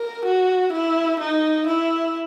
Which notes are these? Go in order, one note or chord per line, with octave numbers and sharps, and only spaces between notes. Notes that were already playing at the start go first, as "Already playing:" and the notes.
Already playing: A#4
F#4
E4
D#4
E4